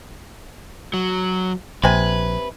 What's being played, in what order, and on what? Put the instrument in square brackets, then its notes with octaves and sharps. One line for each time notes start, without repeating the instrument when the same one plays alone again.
[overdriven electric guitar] F#3
[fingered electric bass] A#1 [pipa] C3 G#5 [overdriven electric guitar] B4